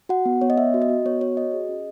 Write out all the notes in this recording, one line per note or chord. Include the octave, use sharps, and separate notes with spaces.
F#4 F#5
B3
B3 C#5
D#5
B3 E5
F#4
D#5
F#4
B3 C#5
F#4 C#5
F#4 D#5
G#4
C#4